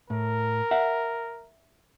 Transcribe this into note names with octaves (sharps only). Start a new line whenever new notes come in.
A2 A#4
E5 F#5